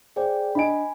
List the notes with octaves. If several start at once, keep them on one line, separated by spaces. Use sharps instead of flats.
G#4 C5 D5 G5
D4 D#5 G#5 B5 D7